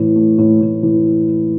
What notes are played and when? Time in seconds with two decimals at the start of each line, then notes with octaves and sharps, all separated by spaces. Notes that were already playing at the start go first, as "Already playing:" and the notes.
Already playing: A2 E3
0.16 A3
0.38 A2
0.61 A2
0.83 E3